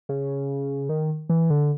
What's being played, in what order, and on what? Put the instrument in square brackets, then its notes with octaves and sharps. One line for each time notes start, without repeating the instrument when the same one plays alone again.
[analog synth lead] C#3
D#3
E3
D3